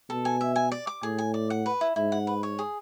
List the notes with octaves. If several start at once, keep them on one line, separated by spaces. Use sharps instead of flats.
B2 A4
G#5
E5
G#5
D5
D6
A2 G#4
G#5
D5
F#5
B4
E4
G#2 E4
F#5
B4
C#5
G#4